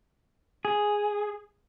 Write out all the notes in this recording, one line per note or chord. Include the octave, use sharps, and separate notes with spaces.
G#4